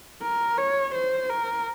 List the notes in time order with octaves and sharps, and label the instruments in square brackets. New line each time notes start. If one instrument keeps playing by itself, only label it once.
[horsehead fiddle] A#4
C#5
C5
A#4